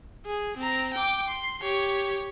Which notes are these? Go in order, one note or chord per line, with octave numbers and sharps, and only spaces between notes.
G#4
C4 A#5
G5 D6
C6
G4 C#5